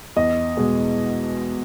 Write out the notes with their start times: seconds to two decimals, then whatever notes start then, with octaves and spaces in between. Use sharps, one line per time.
0.16 E2 D#5
0.57 B2 G#3